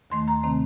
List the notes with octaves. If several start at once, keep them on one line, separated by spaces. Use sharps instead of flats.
D#2 D#3 A3 C6
A#5
C3 D#3 A3 C4